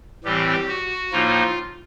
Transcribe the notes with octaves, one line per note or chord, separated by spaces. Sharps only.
A2 E3 G3 C4 G4
F#4
A2 F3 A#3 D#4 F4